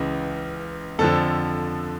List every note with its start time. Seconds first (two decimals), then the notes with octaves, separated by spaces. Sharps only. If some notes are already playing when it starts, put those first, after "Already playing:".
Already playing: C#2 C#3 E3
0.99 F2 D3 F3 A4